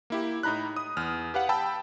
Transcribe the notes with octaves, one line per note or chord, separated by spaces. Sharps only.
A#3 E4 G4
A2 D#4 A#5 B5 F#6
D#6
E2 F6
G4 B4 F5 F#5
G5 A5 B5 E6